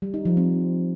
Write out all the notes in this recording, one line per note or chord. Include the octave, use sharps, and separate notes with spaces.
G3
D#4
F3
C4